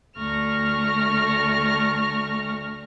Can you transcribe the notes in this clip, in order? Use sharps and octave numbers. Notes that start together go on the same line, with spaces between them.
D2 A3 A#5 C#6 F6